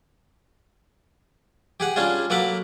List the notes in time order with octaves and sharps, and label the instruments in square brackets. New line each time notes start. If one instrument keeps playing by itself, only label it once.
[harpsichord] G4 G#4 F#5
G3 C#4 D4 F4 G#4
F#3 A#3 A4 F#5 B5 D6